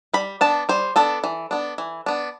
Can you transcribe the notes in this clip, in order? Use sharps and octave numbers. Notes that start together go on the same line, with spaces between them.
G3 B5
B3 D4 A5
G3 C5
B3 D4 A4
E3
B3 D4
E3
B3 D4